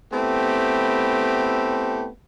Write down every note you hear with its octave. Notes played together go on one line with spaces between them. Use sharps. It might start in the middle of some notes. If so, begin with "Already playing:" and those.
A3 B3 C4 E4 G4